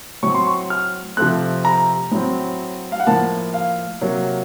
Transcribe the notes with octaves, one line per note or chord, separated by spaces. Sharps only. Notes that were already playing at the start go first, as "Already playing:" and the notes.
A2 F#3 C4 C#6
C6
C#6
F6
C3 F3 A3 C4 F#6
A#5
A2 F#3 C4
F5
F#5
A2 F3 A#3 A5
F5
C3 F#3 A#3